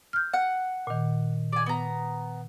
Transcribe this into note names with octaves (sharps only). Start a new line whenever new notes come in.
F6 G6
F#5
A#2 D#3
D5 G#5
B3 A#5